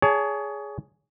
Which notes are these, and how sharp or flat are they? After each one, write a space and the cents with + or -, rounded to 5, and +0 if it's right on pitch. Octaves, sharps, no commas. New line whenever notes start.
G#4 +0 C#5 +30 A5 +0